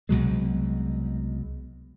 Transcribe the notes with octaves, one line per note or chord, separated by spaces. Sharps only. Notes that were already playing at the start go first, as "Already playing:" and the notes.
C2 B2 F#3 G#3